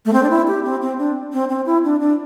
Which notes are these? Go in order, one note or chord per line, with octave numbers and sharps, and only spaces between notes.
A3
C4
D4
E4
G4
C4
C4
D4
C4
C4
E4
D4
D4